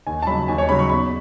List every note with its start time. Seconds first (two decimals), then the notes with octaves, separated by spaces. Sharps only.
0.07 D#2 G#5
0.23 A5
0.27 C#3 F#3 B5
0.48 D#2 G#5
0.58 C#5
0.69 C#3 F#3 B5
0.79 C#6
0.90 E2 B5